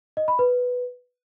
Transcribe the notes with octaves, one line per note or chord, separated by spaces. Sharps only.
D#5
B5
B4